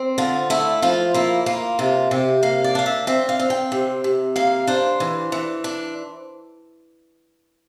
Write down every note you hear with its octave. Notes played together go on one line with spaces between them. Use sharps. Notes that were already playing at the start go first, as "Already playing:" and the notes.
Already playing: C4
D3 F4
A3 E4
F3 F4
A#3 E4
A#3 F4
C3 F4
C3 G4
A#3 F5
D5
D4 F5
E5
C4 E5
F5
C4
G5
C3
C3
A#3 F5
D4 C5
E3
E3
D4